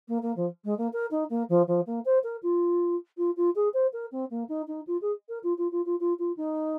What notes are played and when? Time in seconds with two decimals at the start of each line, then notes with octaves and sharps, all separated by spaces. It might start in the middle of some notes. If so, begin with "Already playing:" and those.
0.08 A#3
0.22 A#3
0.36 F3
0.65 G#3
0.78 A#3
0.93 A#4
1.11 D#4
1.30 A#3
1.49 F3
1.67 F3
1.87 A#3
2.05 C5
2.24 A#4
2.43 F4
3.17 F4
3.37 F4
3.55 G#4
3.74 C5
3.93 A#4
4.12 C4
4.31 A#3
4.49 D#4
4.68 D#4
4.87 F4
5.02 G#4
5.29 A#4
5.43 F4
5.58 F4
5.72 F4
5.86 F4
6.00 F4
6.19 F4
6.37 D#4